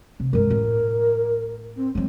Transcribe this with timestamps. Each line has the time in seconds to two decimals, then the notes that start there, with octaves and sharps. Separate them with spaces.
0.20 C3
0.33 G2 G#3 A#4
0.50 A2
1.75 C4
1.95 F#3 G#3 C4